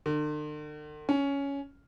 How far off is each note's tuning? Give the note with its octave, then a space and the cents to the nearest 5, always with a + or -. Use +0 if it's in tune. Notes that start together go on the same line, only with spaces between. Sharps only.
D3 +45
C#4 +10